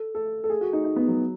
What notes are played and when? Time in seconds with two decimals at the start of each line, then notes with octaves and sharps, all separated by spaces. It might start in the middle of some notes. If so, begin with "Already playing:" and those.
Already playing: A4
0.15 A4
0.44 A4
0.50 G#4
0.61 F#4
0.73 D#4
0.85 D#4
0.96 B3
1.08 F#3